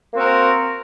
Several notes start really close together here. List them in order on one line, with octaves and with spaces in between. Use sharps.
A#3 C4 F#4 A#4